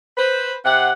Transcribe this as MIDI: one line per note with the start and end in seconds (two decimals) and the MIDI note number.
0.18 0.52 71
0.18 0.52 72
0.65 0.90 48
0.65 0.90 78